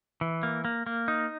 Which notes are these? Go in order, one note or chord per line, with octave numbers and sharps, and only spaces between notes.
E3
A#3
A#3
A#3
D#4